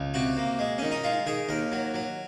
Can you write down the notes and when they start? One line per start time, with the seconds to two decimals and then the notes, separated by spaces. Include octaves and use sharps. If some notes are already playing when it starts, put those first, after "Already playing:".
Already playing: C#2
0.14 C3 F#4
0.37 A#3
0.59 G#3
0.78 D#3 C#4
0.91 D#4
1.04 G#3 F4
1.26 D#3 G#4
1.49 D#2 A#4
1.72 F#3
1.94 F#3